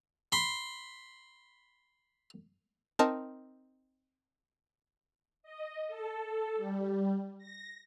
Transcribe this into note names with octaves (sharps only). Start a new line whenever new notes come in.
B5 C6
C4 D#4 A#4 A5
D#5
A4
G3
A#6